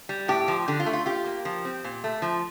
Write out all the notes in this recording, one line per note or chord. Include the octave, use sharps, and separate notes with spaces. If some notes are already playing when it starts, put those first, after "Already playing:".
G3
A2 G4
F3
D3 G4
F4
A3
F4
F4 G4
A#3
F3
C4
A#2
A3
F3